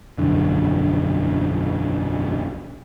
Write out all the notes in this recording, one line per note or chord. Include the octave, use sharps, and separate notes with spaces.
E1 A#1 F#2 D3